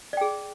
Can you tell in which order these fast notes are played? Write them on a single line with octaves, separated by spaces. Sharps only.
D5 G5 G#4